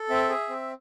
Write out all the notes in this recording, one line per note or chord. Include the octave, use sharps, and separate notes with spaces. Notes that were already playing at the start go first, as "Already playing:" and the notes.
Already playing: A4
C4 E5
G#4
C4